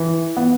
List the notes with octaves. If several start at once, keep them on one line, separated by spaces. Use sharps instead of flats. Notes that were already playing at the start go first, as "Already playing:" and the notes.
Already playing: E3
B3